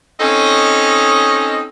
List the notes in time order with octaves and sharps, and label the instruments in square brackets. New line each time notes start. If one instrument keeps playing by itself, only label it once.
[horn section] C4 C#4 D#4 A4 C#5 D#5